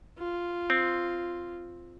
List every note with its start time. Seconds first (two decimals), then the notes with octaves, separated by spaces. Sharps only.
0.19 F4
0.70 C4